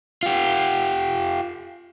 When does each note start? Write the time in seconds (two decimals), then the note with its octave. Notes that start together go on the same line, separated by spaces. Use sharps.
0.23 F4 G4